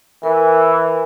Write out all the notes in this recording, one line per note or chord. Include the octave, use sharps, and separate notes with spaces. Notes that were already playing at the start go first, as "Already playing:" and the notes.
E3 A#4